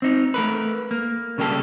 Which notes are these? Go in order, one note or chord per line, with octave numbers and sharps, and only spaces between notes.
C4 D#4
A3 A#4 B4
A#3
C#3 G3 A#3 G4 A4